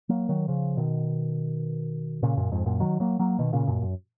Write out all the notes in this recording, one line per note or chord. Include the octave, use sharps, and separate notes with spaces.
F#3 A#3
D#3 F#3
C#3 F3
B2 D#3
A#2 C#3
F#2 A#2
F2 G#2
F#2 A#2
D#3 F#3
F#3 A#3
F#3 A#3
B2 D#3
A#2 C#3
F#2 A#2
F#2